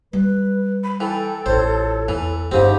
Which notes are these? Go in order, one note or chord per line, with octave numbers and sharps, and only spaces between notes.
G3 B4
B5
E3 A4 G5
A1 F4 C5 C#5
E2 E3
G1 G#2 C#3 C4 F4 G4